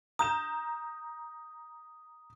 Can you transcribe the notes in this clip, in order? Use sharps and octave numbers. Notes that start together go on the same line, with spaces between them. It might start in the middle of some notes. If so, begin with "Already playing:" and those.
A#5 D#6 G6 E7